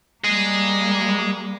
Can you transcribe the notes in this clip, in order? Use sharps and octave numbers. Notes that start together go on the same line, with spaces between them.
G3 A#3 G#4 D#5